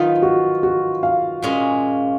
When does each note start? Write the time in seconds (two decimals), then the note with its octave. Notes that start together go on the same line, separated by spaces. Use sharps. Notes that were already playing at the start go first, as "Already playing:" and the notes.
Already playing: D#3 F#3 B3 D#4 F4
0.22 F#4
0.63 F#4
1.03 F5
1.42 A#2 G#3 C#4 G#4